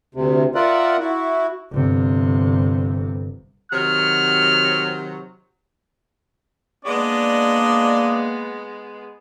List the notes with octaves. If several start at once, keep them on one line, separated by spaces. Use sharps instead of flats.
D2 C3
F4 A#4 D5 E5 F#5
E4 F#4
G1 C3
C3 D#3 F#3 F6
G#3 A#3 B3 D4 D5 D#5